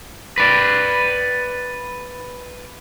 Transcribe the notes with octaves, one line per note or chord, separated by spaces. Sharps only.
B4 D5